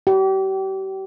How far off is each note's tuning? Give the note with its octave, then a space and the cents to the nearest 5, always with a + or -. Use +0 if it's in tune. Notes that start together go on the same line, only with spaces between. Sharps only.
G4 -35